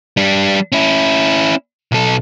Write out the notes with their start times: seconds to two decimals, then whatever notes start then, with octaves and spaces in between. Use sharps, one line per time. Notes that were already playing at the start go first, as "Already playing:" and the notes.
0.17 G3 D4
0.72 C#4 E4
1.92 B1 A4